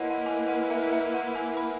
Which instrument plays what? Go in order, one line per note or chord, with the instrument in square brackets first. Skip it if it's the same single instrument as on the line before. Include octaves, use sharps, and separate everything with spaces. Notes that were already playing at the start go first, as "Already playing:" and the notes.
Already playing: [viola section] A#3 E4 B4 [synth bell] C#5 D#5 F#5
[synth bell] F#5
G#5
F#5
E5
E5
F#5
G#5
B5